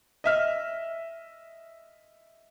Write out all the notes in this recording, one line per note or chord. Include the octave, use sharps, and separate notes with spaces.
D#5 E5 F6